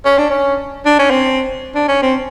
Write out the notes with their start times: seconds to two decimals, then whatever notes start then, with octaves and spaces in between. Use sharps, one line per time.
0.06 C#4
0.18 D4
0.30 C#4
0.86 D4
0.99 C#4
1.11 C4
1.75 D4
1.88 C#4
2.02 C4